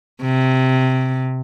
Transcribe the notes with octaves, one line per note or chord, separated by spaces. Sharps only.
C3